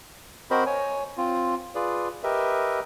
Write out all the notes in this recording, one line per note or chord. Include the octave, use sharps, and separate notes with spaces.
C4 F#4 A#4 C5 D#5 B5
C#5 G#5
C4 F4
F4 G#4 B4 D5
G4 A#4 B4 D#5 E5